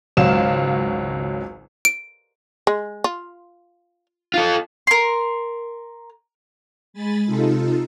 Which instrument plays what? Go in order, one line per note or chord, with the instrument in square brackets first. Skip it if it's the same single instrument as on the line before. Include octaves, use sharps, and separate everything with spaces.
[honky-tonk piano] G#1 C#2 F#3 F5 E7
[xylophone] D7
[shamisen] G#3
F4
[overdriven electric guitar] F4 A4
[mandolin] A#4 C6
[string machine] G#3 G#5 B5 A6
C3 D#4 F4 A4